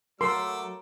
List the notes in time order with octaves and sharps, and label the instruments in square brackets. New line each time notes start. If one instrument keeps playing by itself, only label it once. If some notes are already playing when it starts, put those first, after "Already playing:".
[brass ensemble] F#3 [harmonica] A3 D6 E6 [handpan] A#4 [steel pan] C6